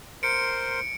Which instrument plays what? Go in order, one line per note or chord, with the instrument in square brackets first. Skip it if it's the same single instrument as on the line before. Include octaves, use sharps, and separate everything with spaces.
[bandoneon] A#4 C5 C6 [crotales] C#7 D7